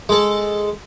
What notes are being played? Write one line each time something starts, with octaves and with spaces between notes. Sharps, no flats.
G#3 A4